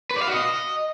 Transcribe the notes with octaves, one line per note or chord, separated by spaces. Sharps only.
B4
D5
F5
F#4
D#5